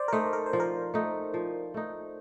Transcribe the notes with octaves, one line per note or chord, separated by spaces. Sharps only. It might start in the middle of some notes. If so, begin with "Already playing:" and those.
Already playing: C5 D5
A#4
A3 D#4 C5
A#4
C5
F3
A#4
A3 D#4
F3
A3 D#4